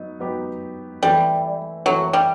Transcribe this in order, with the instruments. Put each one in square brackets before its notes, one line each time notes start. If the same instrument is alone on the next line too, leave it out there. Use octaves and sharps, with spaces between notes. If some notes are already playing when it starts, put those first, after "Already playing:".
Already playing: [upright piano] F#3 B3 D#4
F#3 B3 D#4 G4
[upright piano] E3 A3 C4 E4 [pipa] G3
[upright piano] E3 A3 C4 E4 [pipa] F#3
[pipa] G3